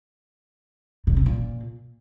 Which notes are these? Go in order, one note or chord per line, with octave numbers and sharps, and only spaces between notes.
A#2
C3
A#2